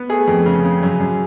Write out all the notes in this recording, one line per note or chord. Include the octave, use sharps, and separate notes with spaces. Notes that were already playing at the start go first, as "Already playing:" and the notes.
Already playing: B3
A3 G#4
F2
C#3
C#3
F#2
F#2